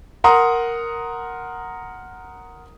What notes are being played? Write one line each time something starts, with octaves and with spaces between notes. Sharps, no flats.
A#4 F#5 A#5 C6 D#6